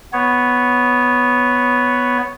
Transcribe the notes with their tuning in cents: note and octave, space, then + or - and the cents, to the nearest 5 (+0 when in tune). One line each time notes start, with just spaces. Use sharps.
B3 +0 C#5 +0